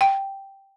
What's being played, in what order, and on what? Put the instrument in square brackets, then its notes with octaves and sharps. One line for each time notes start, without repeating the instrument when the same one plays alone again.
[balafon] G5